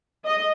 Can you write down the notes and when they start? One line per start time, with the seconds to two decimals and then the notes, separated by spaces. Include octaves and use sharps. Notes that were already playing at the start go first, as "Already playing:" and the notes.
0.25 D#5